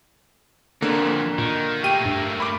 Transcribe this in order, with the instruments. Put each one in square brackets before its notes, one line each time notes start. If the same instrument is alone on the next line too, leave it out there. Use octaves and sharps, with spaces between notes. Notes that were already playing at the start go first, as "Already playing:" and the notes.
[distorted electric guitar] F2 A#2 [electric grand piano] D3 A#3
[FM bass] A#2 [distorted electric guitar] D#3
[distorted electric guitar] A3 A#3 [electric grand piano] G4 G5 D#7
[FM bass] G2
[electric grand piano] B5 D6